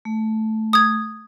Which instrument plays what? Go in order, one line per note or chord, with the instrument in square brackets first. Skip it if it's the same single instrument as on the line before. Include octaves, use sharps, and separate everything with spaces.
[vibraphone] A3
[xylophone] D#6 G#6